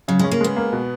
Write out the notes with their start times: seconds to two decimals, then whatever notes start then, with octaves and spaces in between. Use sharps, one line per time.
0.08 C#3 F#3
0.19 G#3 C#4
0.31 A#3
0.41 G#3 B3
0.56 A#3
0.73 B2